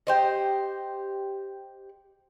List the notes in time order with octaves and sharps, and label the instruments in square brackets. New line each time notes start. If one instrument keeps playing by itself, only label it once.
[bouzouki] G4 C5 D#5